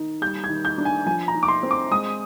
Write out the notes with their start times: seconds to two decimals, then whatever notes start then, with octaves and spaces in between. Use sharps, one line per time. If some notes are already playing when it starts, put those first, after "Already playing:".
Already playing: D#3 D#4
0.21 G3 G6
0.44 G#6
0.50 D#3
0.65 G6
0.78 D4
0.85 G#5
1.06 F3 G#5
1.28 A#5
1.34 D#4
1.43 D6
1.48 C6
1.63 C4
1.71 D6
1.91 G#3 D#6